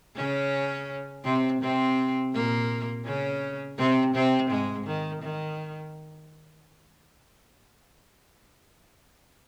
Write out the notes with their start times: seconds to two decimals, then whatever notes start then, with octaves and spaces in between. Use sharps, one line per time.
0.16 C#3 C#4
1.24 C3 C4
1.61 C3 C4
2.34 A#2 A#3
3.05 C#3 C#4
3.78 C3 C4
4.14 C3 C4
4.50 G#2 G#3
4.86 D#3
5.22 D#3